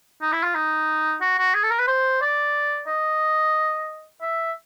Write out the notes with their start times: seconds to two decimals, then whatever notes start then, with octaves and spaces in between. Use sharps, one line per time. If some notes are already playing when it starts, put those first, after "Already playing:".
0.22 D#4
0.32 E4
0.43 F4
0.55 D#4
1.21 F#4
1.38 F#4
1.55 G#4
1.63 A4
1.71 A#4
1.79 B4
1.88 C5
2.22 D5
2.87 D#5
4.22 E5